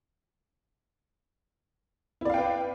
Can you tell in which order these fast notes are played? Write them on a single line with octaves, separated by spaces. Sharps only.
E4 D5 F5 G5 B4